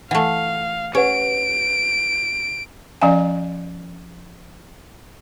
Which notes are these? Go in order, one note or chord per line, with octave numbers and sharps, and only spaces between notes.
E3 A3 F5 F#5
C#4 G4 B4 F#5 D7
F3 C#4 D5 F5 G#5